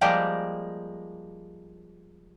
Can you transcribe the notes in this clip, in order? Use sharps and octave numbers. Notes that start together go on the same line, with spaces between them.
F3 G3 G#3 A#3 G4 G5